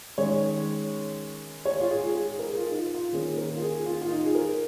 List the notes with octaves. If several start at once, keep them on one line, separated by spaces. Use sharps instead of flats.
D#3 G#3 C#4 C#5
C#5
F4
G#4
G#4
A#4
G#4
F4
D#4
F4
F4
D#3 A#3 C#4 G#4
A#4
D#4
F4
G#4
F4
F4
D#4
G#4
A#4